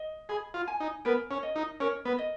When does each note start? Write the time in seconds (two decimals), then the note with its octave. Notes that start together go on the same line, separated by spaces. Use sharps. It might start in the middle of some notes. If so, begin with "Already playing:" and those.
Already playing: D#5
0.29 G#4 B5
0.54 F4
0.67 G#5
0.80 D#4
1.05 B3 A#4
1.31 C#4
1.43 D#5
1.56 D#4
1.80 C#4 A#4
2.05 B3
2.18 D#5